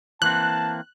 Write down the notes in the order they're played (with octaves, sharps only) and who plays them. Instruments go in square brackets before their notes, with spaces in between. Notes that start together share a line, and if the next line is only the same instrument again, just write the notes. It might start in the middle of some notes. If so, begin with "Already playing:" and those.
[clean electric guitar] E3 A#3 C4 [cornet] A5 [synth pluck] F#6